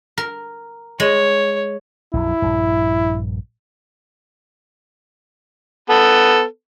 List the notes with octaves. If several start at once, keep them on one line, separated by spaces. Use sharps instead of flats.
A#4
G#3 C#5
A#1 F2 F#3 E4
A#1 G2
B3 A4